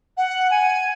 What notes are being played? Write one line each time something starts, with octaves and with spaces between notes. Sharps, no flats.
F#5
G#5